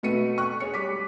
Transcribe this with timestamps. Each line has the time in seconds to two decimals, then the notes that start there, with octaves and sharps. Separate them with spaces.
0.03 B2 A3 F#4 B4 C#7 D#7
0.38 C#6 F#6
0.60 G#4 C#5 C#7
0.74 G3 D6 B6